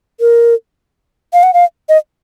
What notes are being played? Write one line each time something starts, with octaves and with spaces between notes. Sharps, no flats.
A#4
F5
F#5
F5
D#5